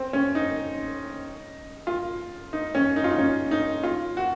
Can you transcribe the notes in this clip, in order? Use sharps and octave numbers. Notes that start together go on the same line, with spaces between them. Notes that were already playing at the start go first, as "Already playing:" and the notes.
Already playing: C4
C#4
D#4
F4
D#4
C#4
D#4
F4
D#4
C#4
D#4
F4
F#4